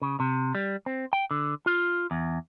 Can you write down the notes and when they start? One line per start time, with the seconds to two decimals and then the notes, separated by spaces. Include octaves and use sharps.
0.02 C#3
0.20 C3
0.55 G3
0.86 C4
1.13 G5
1.31 D3
1.66 F4
2.11 E2